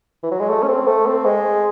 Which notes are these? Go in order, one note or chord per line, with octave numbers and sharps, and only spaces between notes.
E3
F#3
G#3
A3
C#4
C4
A3
C4
G#3